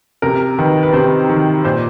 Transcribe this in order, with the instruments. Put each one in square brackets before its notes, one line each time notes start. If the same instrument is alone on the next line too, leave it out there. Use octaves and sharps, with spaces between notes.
[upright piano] C3 A#4
D#3 B4
B4
C3 C5
D#3
A#2 C5